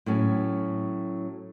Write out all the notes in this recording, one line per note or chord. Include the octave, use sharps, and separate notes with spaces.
A2 F#3 C#4